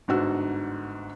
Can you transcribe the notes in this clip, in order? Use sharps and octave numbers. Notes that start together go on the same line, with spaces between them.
G1 G#2 D3 F#4 E6